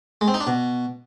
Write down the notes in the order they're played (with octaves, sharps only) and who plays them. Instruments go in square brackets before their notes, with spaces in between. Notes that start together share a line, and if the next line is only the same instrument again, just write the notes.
[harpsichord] G#3
C4
D#4
D4
B2